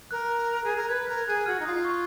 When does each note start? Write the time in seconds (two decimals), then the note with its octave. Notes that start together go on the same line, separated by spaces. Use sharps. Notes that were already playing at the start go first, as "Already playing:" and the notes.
0.11 A#4 F#6
0.64 G#4
0.76 A#4
0.89 B4 G#6
1.07 A#4 G#6
1.27 G#4 F#6
1.46 F#4 F6
1.60 D#4
1.65 F4 D#6
1.85 C#6